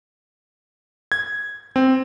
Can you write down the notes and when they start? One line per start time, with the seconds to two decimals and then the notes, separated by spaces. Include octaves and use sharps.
1.12 G#6
1.76 C4